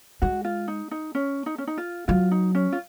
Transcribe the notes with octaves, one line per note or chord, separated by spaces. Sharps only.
G#3 F#4
F4
D#4
D#4
C#4
D#4
C#4
D#4
F4
F#3 F4
D#4
C#4
F4